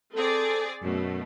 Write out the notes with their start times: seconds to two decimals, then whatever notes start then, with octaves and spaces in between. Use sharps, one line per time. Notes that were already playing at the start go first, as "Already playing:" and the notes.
0.15 C4 G#4 A4 D5
0.83 F#2 B2 A3